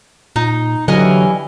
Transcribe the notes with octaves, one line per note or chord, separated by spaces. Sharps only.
A#2 D#4
D3 E3 F#3 G3 E4 D#5 G#5 F6